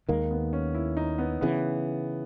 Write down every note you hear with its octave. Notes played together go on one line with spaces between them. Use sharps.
D#2 D#3 G#3 A#3
B3
C#4
E4
D#4
B3
C#3 E3 B3